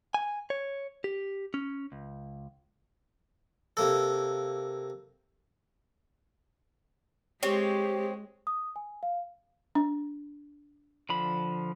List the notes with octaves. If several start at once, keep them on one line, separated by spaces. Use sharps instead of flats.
G#5
C#5
G4
C#4
C#2
C3 A#3 A4
G#3 C4 G4 C#5
D#6
G#5
F5
D4
D3 F3 B5